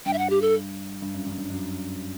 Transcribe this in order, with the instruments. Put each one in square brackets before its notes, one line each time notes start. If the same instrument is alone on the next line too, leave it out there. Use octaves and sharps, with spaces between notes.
[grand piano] G2 [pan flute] G5
[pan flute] E5
F#5
G4
A4
[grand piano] G2
F#2
G2
G2
F#2